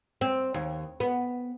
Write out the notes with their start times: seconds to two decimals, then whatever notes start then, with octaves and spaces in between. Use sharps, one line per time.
0.21 C4
0.54 D#2
1.00 B3